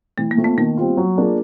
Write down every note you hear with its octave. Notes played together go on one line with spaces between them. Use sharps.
E3 A3
A#3
A3 C4 F4
B3
D#3 A#3
G3 C4 F4
F#3
A#3 D4 F4 G#4